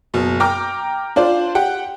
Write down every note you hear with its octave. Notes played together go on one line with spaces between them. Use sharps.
F#1 B2
G5 A#5 D6 F6
D4 F4 C5 D5
G4 F#5 G5